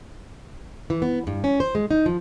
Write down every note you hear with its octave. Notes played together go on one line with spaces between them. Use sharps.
E3
B3
G2
C#4
C5
G#3
D#4
F3